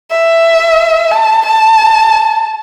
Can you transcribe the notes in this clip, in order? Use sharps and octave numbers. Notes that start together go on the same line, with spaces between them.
E5
A5
A5